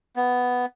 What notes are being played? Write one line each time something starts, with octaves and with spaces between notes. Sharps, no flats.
B3